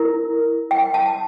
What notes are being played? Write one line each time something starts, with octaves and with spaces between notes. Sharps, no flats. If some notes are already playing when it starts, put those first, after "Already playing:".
Already playing: E4 A#4
G5
A5